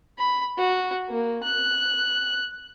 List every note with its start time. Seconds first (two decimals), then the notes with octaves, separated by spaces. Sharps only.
0.18 B5
0.58 F#4
1.09 A#3
1.43 F#6